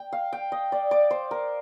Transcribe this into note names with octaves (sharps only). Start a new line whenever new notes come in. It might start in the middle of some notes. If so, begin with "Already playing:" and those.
Already playing: G5
F5
G5
D#5
D5
D5
C5
A#4